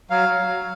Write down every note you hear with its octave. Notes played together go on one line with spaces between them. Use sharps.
F#3 F5
F#3
F#3